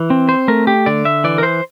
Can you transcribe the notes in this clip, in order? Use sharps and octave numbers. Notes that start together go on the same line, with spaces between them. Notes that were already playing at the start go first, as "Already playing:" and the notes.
Already playing: E3
C4
C5
A3 A#4
G4
D3 D5
E5
E3 D5
A#4
C5